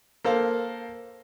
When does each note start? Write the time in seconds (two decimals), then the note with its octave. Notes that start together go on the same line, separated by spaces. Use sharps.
0.25 A#3 A4 C5 F5